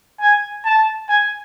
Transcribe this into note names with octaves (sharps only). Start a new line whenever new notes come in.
G#5
A5
G#5